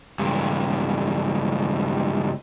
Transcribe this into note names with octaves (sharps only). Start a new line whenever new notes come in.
C#2 G2